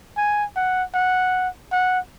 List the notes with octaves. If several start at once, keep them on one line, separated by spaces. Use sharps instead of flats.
G#5
F#5
F#5
F#5